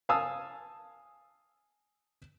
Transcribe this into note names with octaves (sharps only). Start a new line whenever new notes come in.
F5 G#5 A5 D#6 E6